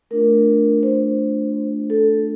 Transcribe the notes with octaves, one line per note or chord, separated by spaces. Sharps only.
A3 D4 F4 A#4
C5
A4